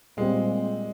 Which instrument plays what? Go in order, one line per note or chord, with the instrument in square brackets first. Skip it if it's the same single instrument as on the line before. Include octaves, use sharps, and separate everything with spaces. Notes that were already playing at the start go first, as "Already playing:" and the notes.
[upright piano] A#2 G3 C4 [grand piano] G#3